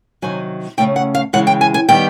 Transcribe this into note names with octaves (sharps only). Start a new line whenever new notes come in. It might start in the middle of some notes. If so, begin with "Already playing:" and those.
C3 D#3 F#3 G#5
C#3 E3 A3 C#4 G5
F#5
F5
C#3 E3 G#3 F#5
G5
G#5
G#5
D#3 G3 B3 G5